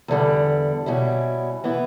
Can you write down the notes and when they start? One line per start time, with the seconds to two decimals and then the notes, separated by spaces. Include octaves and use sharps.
0.08 E2 D3 G3
0.86 B2 G3 C#4 E4
1.64 E3 B3 E4